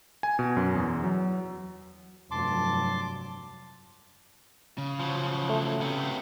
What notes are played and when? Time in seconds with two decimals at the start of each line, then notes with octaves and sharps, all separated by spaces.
0.23 G#5
0.39 B2
0.57 F#2
0.75 E2
1.04 F#3
2.31 F1 G2 F#3 A5 C6 D6
4.78 C#3
5.00 F3 F#3
5.49 A3
5.80 C3 B3